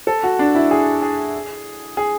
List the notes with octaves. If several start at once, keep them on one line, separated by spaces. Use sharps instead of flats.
A4
F#4
D4
E4
G#4
G#4
G#4